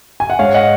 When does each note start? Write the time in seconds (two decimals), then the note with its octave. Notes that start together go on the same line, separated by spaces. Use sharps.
0.20 G#5
0.30 F#5
0.39 G#2 C#5 F5
0.54 D#5 F#5